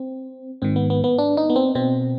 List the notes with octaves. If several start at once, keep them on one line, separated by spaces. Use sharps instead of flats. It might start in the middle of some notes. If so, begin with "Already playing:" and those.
Already playing: C4
G#2 D#3 C4
B3
B3
B3
D4
D#4
B3
C4
B2 C4